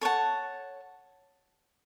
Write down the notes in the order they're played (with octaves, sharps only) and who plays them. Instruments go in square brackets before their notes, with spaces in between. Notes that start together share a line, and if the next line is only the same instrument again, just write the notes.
[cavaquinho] A4 C#5 F#5 A5